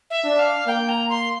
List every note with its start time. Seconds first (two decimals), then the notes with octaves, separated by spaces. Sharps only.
0.10 E5
0.25 D4
0.39 F5
0.67 A#3 G5
0.89 A#5
1.09 C6